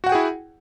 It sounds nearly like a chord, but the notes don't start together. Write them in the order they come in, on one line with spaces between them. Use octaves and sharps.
F#4 F#5 G5 G#4 E4